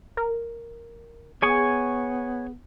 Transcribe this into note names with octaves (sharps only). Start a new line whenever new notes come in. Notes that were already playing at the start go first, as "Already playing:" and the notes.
A#4
B3 G#4 C#5 G#5 C#6